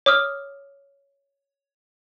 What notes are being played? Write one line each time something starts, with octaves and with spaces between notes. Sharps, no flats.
C#5 D6 D#6 F6